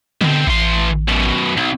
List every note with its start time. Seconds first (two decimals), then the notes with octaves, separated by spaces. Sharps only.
0.21 B2 D3 C4
0.47 A1 E3 C6
1.09 F#2 B2
1.57 B1